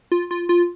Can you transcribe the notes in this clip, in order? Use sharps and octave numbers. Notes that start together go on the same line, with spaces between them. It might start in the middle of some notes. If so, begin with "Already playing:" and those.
F4
F4
F4